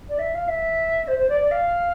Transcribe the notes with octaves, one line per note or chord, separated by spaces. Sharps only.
D5
E5
F5
E5
C5
C5
D5
D5
F5